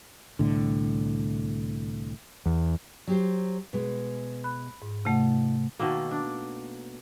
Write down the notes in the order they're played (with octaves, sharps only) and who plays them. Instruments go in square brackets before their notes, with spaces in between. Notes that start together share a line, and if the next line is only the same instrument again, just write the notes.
[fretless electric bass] C2 A2 D3
[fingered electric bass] E2
[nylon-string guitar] F#3 G4 C5
B2 G#3
[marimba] B5 F#6
G#2
[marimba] C3 A3 F#5 [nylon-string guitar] D#4 F4
[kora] B2 D#3 A3 A#3
D4